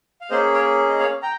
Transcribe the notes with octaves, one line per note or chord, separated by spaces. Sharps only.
F5
A#3 C#4 G#4 C5 D#5
A#4 C#5
D#5
C#5 F5
G5 A#5